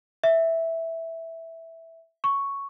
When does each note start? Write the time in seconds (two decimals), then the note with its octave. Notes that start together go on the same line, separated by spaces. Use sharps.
0.23 E5
2.24 C#6